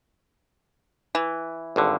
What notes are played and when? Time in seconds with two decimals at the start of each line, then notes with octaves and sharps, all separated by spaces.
1.15 E3
1.76 G#1 G2 D3